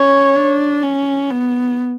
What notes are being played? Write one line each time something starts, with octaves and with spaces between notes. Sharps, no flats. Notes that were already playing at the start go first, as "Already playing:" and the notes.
Already playing: C#4 C#5
D4
C#4
B3